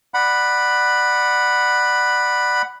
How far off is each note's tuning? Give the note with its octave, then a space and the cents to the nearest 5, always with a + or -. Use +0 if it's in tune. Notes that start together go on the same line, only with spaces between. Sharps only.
D5 +20 F#5 +0 B5 +0